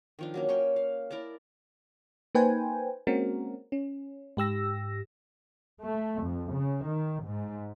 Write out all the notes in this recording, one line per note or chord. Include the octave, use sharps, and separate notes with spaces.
D#3 F3 D4
F#3 A#3 C#4
C#4 C#5 G5
F5
E4 A#4 D5 A5
A#3 D#4 B4 C5 G5 G#5
G#3 A#3 C4 C#4 F#4 A#4
C#4
G#2 G4 E6 A#6
A3
F2
C#3
D#3
G#2